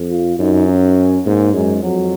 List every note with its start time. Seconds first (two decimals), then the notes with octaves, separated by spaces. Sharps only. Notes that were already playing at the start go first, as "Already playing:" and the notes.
Already playing: F2
0.11 F4
0.39 F#2 D#4
0.68 C#4
1.26 G#2 A#3
1.54 F#2 G#3
1.83 F2 F#3